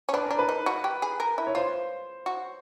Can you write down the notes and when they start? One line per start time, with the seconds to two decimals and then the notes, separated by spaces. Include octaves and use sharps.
0.09 C#4
0.13 D4 B4
0.26 D4 A#4
0.39 B4
0.49 D#4
0.66 F#4
0.84 G4
1.02 G#4
1.20 A#4
1.38 E4
1.47 C#5
1.55 F4 C5
2.26 F#4